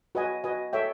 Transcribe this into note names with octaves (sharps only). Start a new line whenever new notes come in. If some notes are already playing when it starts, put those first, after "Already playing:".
F#4 B4 D#5 G#5
F#4 B4 D#5 G#5
A4 C#5 E5 G5